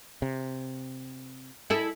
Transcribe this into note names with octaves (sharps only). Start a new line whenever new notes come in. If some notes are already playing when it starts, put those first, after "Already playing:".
C3
E4 G#4 A4